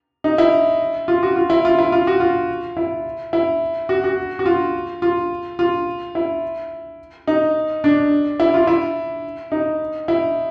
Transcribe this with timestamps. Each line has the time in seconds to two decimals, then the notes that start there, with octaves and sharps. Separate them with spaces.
0.24 D#4
0.38 E4
1.08 F4
1.23 F#4
1.36 F4
1.50 E4
1.65 F4
1.79 E4
1.92 F4
2.07 F#4
2.20 F4
2.77 E4
3.33 E4
3.89 F#4
4.04 F#4
4.39 F#4
4.46 F4
5.02 F4
5.59 F4
6.15 E4
7.28 D#4
7.84 D4
8.40 E4
8.54 F4
8.67 E4
9.52 D#4
10.08 E4